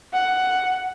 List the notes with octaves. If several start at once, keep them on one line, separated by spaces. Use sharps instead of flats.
F#5